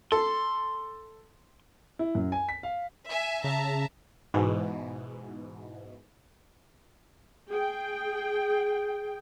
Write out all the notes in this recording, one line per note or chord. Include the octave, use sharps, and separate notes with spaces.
A4 C6
E4
F#2
G#5
B6
F5
E5 G#5
C#3 E5 A5 A#5
G#2 B2 E3
G#4 G5